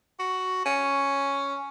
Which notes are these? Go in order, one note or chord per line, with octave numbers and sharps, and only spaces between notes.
F#4
C#4